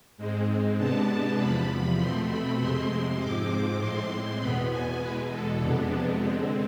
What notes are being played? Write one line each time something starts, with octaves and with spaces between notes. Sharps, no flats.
G#2 G#3 C4
C3 G#3 B3 D4 A5
E2 C3 F3 B5
B2 A3 C4 C6
B5
F2 C3 G#3 C4 C6
G#2 F3 G#3 C4 D6
A2 G#3 C4 C6
E2 B2 B3 B5
G#5
E2 B2 G#3 B4
A4
F2 C3 G#3 B3 D4
D3 G#3 C4